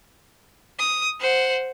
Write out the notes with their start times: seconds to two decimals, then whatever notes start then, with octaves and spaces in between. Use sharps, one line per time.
0.79 D#6
1.20 C5 F#5